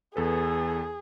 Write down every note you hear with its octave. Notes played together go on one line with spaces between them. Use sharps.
E2 G#4 A4 B4